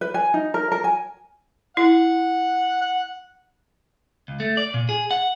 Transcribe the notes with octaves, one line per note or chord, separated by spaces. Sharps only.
B4
G#5
D#4
A#4
A#4
G#5
E4 F#5
F#5
C#2
A3
D5
A#2
G#4
F#5